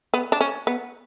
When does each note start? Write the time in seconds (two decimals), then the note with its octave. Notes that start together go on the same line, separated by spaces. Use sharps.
0.14 B3
0.32 D4
0.41 C#4
0.67 B3